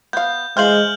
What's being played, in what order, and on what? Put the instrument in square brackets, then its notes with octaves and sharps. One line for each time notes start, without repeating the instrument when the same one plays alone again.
[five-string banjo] B3 F5 [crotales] G6
[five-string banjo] E3 C5 F5 [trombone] G#3 [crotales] F6 G6 F#7